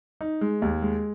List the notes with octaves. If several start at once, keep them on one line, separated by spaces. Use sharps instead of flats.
D#4
G#3
D#2
G#3